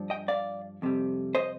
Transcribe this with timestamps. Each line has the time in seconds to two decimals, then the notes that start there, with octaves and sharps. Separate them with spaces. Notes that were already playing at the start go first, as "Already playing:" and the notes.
Already playing: G2 F3
0.10 D#5 G5
0.28 D5 F5
0.82 F2 C3 G3
1.35 C5 D#5